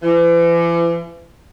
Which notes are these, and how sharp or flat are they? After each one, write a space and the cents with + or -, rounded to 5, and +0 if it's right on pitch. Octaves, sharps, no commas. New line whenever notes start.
E3 +40